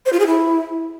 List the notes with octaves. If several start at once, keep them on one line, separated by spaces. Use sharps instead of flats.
C5
F4
G#4
E4